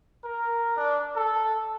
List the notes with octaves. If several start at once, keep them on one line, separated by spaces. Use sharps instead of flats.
A#4
D4
A4